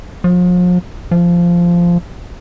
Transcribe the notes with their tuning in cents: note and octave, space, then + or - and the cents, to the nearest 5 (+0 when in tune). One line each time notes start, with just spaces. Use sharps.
F3 +40
F3 -10